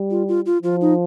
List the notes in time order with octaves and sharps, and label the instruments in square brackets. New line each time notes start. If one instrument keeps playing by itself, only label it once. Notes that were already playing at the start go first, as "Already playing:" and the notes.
Already playing: [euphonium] G3
[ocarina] F4
F4
F4
[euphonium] F3 [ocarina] F4
[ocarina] D#4